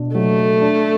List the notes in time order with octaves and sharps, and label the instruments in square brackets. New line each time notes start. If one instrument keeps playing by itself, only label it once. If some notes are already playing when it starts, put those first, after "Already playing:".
Already playing: [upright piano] B2 D4
[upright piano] F#3 [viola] A3
[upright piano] A4
D4